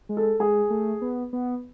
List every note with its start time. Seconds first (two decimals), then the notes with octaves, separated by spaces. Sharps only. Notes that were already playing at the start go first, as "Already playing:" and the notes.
0.09 G#3
0.17 A4
0.40 G#3 G#4
0.70 A3
1.02 B3
1.33 B3